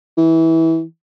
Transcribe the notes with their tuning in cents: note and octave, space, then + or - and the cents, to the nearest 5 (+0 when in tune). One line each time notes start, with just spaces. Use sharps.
E3 -20